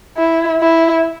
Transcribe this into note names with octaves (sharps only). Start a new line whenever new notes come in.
E4
E4